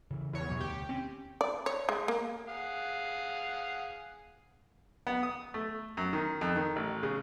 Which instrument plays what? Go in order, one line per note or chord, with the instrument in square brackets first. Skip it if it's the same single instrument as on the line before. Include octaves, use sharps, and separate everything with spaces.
[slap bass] C#3 E3
[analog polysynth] E2 C#5
[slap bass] B2 F#3
[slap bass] D2 [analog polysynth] G4
[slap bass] C4 C#4
[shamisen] D5
C#5
G#3
A#3
[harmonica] G#4 F5 F#5
[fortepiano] B3
D#6
A3
F#2
D#3
F2
D#3
A1
C#3